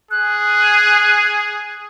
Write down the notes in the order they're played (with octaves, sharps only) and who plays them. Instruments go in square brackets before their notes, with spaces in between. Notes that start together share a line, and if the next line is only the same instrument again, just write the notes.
[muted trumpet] G#4 [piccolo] F#6